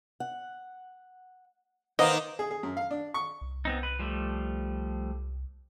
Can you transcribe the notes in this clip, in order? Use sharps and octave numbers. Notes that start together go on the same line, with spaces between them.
F#5
D#3 A#3 B4 C5 D#5 F#5
G#4
G#4
F#2
F5
D4
C#6
C2
B3 C4 D#4
B4
F3 G3 A3